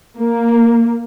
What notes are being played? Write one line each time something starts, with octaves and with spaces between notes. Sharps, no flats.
A#3